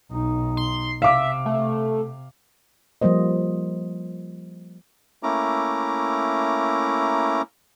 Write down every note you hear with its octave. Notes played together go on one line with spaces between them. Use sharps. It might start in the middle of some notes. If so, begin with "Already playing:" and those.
B1 D#4
C6
C3 E5 F5 D6
A3
F3 G3 A#3 C5 D#5
A3 A#3 C#4 E4 A#5 D6